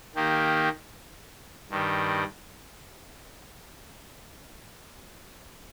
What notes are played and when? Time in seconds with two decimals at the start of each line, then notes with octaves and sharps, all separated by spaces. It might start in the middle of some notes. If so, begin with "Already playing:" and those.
0.16 D#3 A#3 G4
1.70 G2 D#3 G3